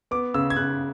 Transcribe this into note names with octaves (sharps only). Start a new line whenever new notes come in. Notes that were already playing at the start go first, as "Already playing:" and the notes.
B3 D6
C#3 E6
G#6
C#3 F#6